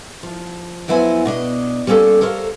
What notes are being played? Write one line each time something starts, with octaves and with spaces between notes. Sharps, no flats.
F3
F2 F#3 B3 E4 C5 G#5
B2 D4 D#5
G3 A#3 C#4 D#4 A4
A4 A#4 C5 C#5 F5